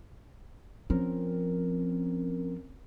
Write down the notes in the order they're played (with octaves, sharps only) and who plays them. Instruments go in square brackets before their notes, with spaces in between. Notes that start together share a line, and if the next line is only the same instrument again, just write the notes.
[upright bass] F3 [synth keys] C4 C#4 A#4